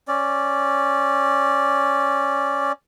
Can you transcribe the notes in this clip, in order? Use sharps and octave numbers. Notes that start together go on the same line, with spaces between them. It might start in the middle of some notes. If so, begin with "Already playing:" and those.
C#4 D5